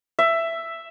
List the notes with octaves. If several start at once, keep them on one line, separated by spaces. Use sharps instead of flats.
E5